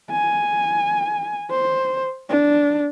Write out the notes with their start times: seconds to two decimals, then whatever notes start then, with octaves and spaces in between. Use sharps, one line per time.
0.11 G#5
1.51 C5
2.29 D4